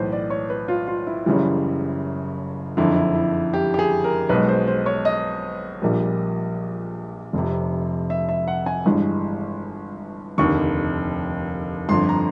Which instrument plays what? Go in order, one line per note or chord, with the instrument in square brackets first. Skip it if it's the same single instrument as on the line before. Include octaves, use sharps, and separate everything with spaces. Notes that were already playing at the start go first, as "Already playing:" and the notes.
Already playing: [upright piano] B1 A2 E3 B4 C5
D5
C#5
B4
F4
F4
E4
F#1 F#2 C#3 E3 G3
F#1 F2 D3 E4
E4
E4
G4
G4
G#4
A#4
B1 B2 G#3 B4
C5
C5
C#5
D#5
A#1 A#2 G3
F1 F2 C3
E5
E5
F#5
G#5
G1 G2 E3 G#3
F1 D#2 D3 C#6
G1 F2 D3 C6
A#5